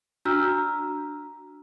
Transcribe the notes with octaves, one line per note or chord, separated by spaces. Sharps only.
D4 F#4 A#5 E6 F6